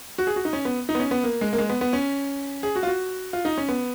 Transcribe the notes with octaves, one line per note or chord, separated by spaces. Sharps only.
F#4
G#4
F#4
D#4
C#4
B3
D#4
B3
C#4
B3
A#3
G#3
A#3
G#3
B3
B3
C#4
G#4
F#4
F4
F#4
F4
D#4
C#4
B3